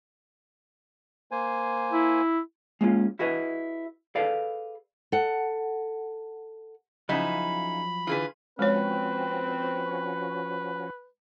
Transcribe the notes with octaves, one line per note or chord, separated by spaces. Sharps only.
A#3 C5 G#5
E4
G#3 A#3 C#4 F4
E4 F#4 G#4 B4 D#5
G#4 A4 B4 D5 F5
A4 F#5
C#3 F3 F#3 D#4 E4 B5
D3 E3 F4 G#4 B4
F3 G#3 C4 C#4 F#4 B4 C#5